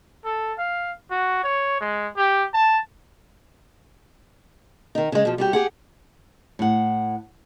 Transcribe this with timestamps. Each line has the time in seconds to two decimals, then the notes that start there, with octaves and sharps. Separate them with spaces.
0.25 A4
0.58 F5
1.11 F#4
1.43 C#5
1.81 G#3
2.17 G4
2.54 A5
4.95 D#3 D#4
5.12 C#3 G#3
5.25 B2 F3
5.38 G3 F#4 G4
5.53 G4 G#4 F#5
6.59 A2 F#5